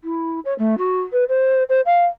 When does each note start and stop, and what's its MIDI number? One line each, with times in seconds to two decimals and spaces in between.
0.04 0.40 64
0.45 0.54 73
0.59 0.75 57
0.78 1.01 66
1.13 1.24 71
1.29 1.63 72
1.69 1.81 72
1.86 2.05 77